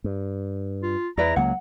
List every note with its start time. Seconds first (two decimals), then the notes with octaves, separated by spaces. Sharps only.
0.04 G2
0.83 F4
1.17 E2 E4 B4 D5 A#5
1.36 C#2 F#3 A#3 F#5